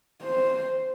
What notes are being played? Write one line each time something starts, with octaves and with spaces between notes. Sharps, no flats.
C5